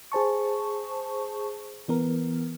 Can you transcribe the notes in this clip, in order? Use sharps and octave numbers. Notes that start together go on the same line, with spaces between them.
G#4 C5 A5 C#6
E3 B3 A#4